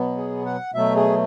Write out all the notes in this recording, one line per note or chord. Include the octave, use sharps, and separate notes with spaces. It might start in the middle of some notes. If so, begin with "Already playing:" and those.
Already playing: B2 F#3 B3
G#4
F#5
B2 F#3 A3 E5
G#4